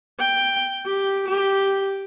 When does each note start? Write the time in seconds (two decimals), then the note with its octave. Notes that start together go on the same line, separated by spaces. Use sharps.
0.19 G5
0.86 G4
1.28 G4